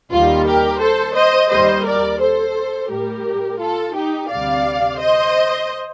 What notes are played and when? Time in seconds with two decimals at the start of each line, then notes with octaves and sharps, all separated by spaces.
0.11 D#2 D#3 G3 F4
0.46 G4 A#4
0.80 A4 C5
1.15 C5 D#5
1.50 D#2 D#3 G3 C5 D#5
1.85 A#4 D5
2.20 A4 C5
2.90 A2 G3 G4 A#4
3.59 F4 A4
3.94 D#4 G4
4.29 D2 C3 G3 D5 F5
4.99 C5 D#5